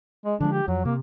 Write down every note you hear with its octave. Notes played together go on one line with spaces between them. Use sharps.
G#3
D3 F3 G#3 D4
G4
F2 F#3
C3 A#3